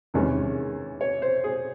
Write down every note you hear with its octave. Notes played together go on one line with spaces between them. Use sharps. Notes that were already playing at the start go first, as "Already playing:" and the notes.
E2 C3 D#3 G#3 C#4
C#5
C5
G#4